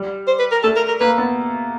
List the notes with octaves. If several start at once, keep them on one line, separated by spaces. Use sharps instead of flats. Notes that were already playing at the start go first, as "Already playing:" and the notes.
Already playing: G3
C5
B4
A#4
A3 A4
A#4
A#4
A#3 B4
B3